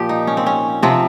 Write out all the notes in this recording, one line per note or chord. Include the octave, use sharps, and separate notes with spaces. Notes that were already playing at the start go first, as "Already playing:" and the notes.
Already playing: A#2 F3 G4
D#4
C#4
C4
C#4
C3 F3 C4